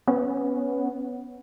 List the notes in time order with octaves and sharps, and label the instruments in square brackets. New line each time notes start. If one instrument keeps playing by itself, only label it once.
[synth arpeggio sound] B3 C#4